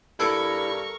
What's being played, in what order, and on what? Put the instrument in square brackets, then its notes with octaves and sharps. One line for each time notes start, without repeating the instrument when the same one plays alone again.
[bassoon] G2 [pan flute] E4 [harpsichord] A4 [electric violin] A#4 C#6